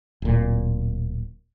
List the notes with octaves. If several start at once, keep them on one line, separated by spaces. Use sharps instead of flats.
D1 A#2